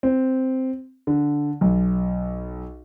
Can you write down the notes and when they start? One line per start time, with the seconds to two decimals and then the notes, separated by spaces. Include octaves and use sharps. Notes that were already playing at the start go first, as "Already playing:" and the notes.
0.03 C4
1.07 D3
1.61 B1